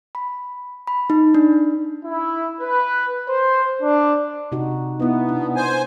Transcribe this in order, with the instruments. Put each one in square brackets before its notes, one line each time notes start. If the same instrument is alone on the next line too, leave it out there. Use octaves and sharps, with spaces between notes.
[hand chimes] B5
B5
D#4
D4
[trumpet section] E4
B4
C5
D4
[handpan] C3 D#4 F#4
[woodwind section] B3 [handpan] D#4 E4
[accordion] B2 [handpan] D4
[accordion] C5 G#5